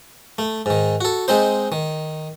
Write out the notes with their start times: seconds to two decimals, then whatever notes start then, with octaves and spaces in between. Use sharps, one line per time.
0.38 A3
0.66 G#2 D#3
1.01 F#4 A4
1.28 G#3 C4 D#4 C5
1.72 D#3